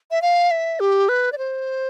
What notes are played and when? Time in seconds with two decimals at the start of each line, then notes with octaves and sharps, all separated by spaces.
0.11 E5
0.22 F5
0.51 E5
0.80 G4
1.09 B4
1.32 D5
1.38 C5